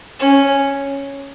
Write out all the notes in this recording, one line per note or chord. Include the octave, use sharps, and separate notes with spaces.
C#4